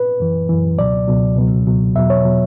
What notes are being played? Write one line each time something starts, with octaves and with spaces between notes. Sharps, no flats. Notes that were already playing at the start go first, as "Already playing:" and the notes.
Already playing: B4
F#2 E3
F#2 E3
C#2 B2 F#3 D5
C#2 B2 F#3
C#2 B2 F#3
C#2 B2 F#3
E2 B2 F#3 E5
C#5
B2 F#3